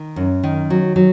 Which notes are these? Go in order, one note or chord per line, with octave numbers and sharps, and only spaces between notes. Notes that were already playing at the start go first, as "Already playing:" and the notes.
Already playing: D#3
F#2
D#3
F#3
F#3